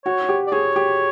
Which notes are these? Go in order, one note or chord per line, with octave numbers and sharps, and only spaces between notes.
F#4 C#5
G4
D5
G#4 C#5
G4